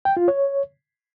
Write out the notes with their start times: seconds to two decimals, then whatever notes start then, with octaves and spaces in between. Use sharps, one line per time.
0.05 G5
0.17 F4
0.28 C#5